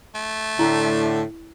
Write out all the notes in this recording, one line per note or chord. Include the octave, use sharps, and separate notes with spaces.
A3
A2 D3 E4